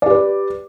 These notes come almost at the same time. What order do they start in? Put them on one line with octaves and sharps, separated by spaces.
D5 G4 B4